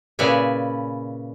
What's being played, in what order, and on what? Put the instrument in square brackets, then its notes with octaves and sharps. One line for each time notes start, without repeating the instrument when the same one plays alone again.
[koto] A#2 C#3 E4 B4 D5 G#5